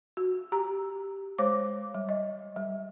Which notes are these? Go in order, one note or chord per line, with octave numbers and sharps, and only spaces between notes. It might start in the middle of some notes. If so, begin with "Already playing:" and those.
F#4
G4 A#5
G#3 C5 C#5 D6
G3
D#5
G3